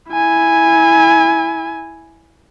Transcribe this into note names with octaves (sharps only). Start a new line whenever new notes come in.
E4 G#5